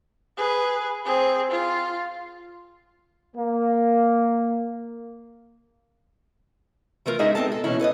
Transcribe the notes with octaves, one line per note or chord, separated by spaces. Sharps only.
G#4 B4
C4 G#4
F4
A#3
E3 A3 F4 A#4
G#3 C#4 D#4 G#4 D#5 E5
A#2 B3 C4 A4 A5
A4
B2 E3 A#3 C#4 E4
A4 B4 C#5 D#5